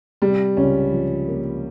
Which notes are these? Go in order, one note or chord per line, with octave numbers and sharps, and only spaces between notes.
C3 G3
C#2 C#4
F3
A#3